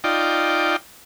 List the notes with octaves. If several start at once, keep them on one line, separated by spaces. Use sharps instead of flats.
D#4 F4 D5 G5